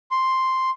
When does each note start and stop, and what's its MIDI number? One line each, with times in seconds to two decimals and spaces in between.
0.11 0.70 84